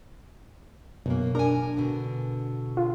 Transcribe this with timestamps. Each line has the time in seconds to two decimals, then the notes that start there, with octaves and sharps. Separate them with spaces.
1.06 F#2 B2 A#3
1.35 D4 A#4 G#5
1.77 B2 D3
2.77 F4